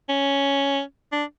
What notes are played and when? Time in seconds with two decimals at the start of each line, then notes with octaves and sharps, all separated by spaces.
0.09 C#4
1.12 D4